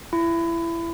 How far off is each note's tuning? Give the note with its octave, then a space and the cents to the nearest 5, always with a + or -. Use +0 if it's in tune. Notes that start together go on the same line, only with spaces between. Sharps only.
E4 +25